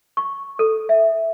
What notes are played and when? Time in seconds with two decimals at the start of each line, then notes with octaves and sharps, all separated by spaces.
0.17 C#6
0.59 A4
0.89 E5